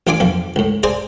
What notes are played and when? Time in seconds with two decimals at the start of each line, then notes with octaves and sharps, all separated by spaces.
0.07 A1 D4 F4 D5 G#5 D6
0.20 B1 F2 F5
0.56 C#2 A2
0.83 G#4 C5 D5 G#5 A5